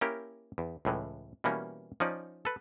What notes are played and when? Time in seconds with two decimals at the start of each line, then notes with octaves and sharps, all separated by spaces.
0.01 A#3 C#4 E4 G4 A#4
0.58 E2
0.85 C#2 A2 E3
1.44 B2 E3 G3 A#3 C#4
2.00 F3 C#4 D#4 D5
2.45 A4 B4